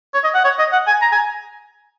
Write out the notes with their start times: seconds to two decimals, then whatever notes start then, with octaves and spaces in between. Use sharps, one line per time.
0.14 C#5
0.24 D#5
0.34 F#5
0.44 C#5
0.59 D#5
0.72 F#5
0.87 G#5
1.02 A#5
1.12 G#5